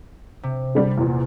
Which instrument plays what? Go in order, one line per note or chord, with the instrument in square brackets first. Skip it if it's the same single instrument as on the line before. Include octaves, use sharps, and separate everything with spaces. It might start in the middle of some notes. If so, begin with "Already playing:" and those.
[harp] C3
[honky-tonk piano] D3 G3 D4
E2 A#2